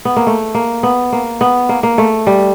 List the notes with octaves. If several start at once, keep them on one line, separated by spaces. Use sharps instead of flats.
B3
A#3
A3
A#3
B3
A#3
B3
A#3
A#3
A3
G3